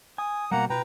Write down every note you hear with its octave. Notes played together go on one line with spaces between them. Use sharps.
G#5 D#6
B2 G3 A#3 F#5 A#5
B2 F4 B4 G5 A#5